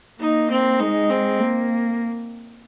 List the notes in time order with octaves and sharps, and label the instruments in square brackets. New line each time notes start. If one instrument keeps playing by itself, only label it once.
[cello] A#3 [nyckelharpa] D#4
[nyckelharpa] C4
[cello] G#3 [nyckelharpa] D#4
[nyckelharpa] C4
[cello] A#3